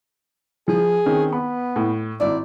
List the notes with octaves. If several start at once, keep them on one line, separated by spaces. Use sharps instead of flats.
F3 G#4
D#3 C4 C#4
B3 B5
A2
G#1 E4 D5